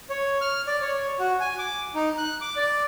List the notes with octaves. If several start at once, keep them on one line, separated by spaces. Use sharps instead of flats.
C#5
F6
D5
C#5
F#4
G#5
D6
D#4
F#6
D6
D5